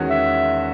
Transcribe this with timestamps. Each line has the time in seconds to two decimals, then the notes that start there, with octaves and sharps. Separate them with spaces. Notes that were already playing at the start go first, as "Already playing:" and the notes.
Already playing: E2 D#3 G#3 C#4 F#4
0.10 E5